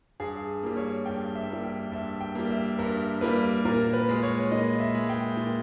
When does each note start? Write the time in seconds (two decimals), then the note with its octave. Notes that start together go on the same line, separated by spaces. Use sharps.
0.20 G2 G#4
0.63 G3 A#3
0.77 C#5
1.06 G2 G5
1.35 E5
1.50 G3 A#3
1.64 G5
1.92 G2 E5
2.21 G5
2.35 G3 A#3
2.50 E5
2.79 G2 A#4
3.21 G3 A#3 B4
3.65 A#2 A#4
3.93 B4
4.09 G#3
4.23 C#5
4.51 A#2 D#5
4.80 E5
4.94 G#3
5.10 G5
5.37 A#2